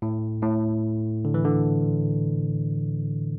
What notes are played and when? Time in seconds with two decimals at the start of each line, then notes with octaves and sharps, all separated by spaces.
0.02 A2
0.42 A2
1.25 D3
1.34 E3
1.45 D3